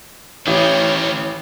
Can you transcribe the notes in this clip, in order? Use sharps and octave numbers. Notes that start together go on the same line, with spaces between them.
A1 D#3 C4 C#5